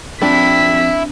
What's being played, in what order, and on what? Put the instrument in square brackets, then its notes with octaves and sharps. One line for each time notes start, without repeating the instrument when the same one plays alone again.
[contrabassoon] F2 [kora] C4 D4 [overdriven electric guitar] E4 [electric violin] B6